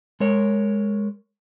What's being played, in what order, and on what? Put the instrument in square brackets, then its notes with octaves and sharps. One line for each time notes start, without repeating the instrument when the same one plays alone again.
[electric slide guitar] G#3 A#4 C#5